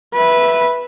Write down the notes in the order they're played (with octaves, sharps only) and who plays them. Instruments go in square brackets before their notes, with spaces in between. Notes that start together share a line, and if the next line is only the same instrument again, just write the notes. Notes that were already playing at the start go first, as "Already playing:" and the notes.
[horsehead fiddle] B4 E5